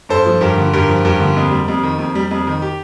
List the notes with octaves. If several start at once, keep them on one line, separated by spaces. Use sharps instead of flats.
G2 A4 C5
F3
G2 G4 A#4
D3
G2 G4 A#4
F3
G2 G4 A#4
D3
F2
G3
F2
D#3
F2
G3
F2
D#3
G4